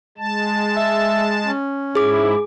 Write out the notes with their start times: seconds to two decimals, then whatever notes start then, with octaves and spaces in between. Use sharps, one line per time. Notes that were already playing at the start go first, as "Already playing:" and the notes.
0.18 G#3 A5
0.76 E5
1.47 C#4
1.95 G#2 E4 G#4 D6